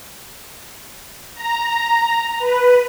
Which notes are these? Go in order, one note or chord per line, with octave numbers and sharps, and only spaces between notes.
A#5
B4